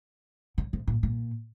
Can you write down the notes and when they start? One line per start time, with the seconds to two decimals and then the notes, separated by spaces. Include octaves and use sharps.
0.58 C#3
0.73 C3
0.87 A#2
1.03 A#2